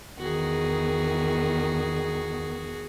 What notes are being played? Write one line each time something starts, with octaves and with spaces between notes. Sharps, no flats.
E2 D#3 F#4 G#4